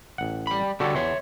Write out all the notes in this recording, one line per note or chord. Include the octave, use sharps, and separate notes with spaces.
A1 F#5
G3 B5
D3 G3 F#4 G4 A4 C#5
E2 C#5 E5 C6